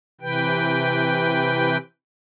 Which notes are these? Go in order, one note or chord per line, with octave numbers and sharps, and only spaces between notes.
C3 E3 B4 G5